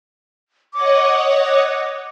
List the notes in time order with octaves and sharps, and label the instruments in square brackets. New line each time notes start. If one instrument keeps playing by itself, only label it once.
[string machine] C#5 D#5 F#5 [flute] D6